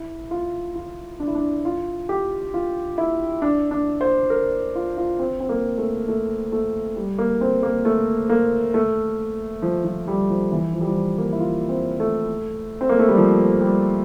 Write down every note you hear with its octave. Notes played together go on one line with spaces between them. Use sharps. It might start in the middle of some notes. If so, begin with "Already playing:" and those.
Already playing: E4
F4
F4
D4
E4
D4
F4
G4
F4
E4
D4
D4
C5
A#4
F4
F4
C4
C4
A#3
A3
A3
A3
G3
A#3
C4
A#3
A3
A#3
A3
F3
F3
G3
F3
E3
F3
G3
F3
A#3
E4
F4
C4
A3
C4
A#3
A3
G3
F3
G3